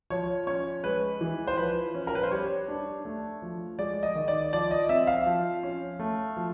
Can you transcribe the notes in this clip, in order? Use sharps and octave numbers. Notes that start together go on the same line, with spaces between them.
F3 C#5
C#4 C#5
G#3 B4
E3
C5
F3 B4
C#4
A#4
B4
C5
G3 C#5
D4
A3
F3
G#3 D5
D#5
D#3
D5
F3 D5
D#5
C4 E5
F5
F3
C#4
A3
F3